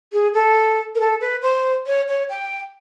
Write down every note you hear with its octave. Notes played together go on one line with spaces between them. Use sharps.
G#4
A4
A#4
A4
B4
C5
C#5
C#5
G5